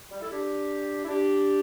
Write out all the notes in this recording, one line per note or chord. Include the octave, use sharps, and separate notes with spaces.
G3
E4 A4
D4 G4
E4
D4 G4